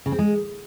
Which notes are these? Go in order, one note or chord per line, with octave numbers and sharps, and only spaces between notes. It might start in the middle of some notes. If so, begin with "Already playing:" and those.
C#3
C4
G#3